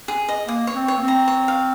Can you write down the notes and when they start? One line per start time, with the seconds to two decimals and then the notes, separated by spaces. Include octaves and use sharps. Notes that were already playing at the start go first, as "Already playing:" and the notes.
0.08 G#4
0.29 D#5
0.48 A#3 D#6
0.67 C#5
0.75 C4
0.88 C#5
0.97 A#3
1.02 C4
1.08 A#5
1.28 C#5
1.48 F5